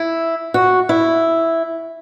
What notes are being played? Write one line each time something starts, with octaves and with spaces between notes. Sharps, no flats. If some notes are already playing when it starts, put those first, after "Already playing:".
Already playing: E4
F#4
E4